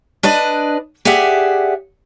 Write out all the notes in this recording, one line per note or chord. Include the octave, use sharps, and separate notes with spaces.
D4 B4 D5 D#5
G4 G#4 D5 E5 F#5